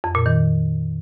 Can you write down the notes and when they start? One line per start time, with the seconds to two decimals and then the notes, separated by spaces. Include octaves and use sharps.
0.04 F2
0.15 A#2
0.26 D#3